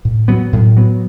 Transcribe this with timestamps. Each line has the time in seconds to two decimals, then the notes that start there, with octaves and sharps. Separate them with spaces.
0.05 A2
0.28 F#3 B3
0.53 A2
0.77 F#3 B3